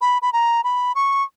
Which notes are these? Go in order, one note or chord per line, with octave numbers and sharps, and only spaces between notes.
B5
B5
A#5
B5
C#6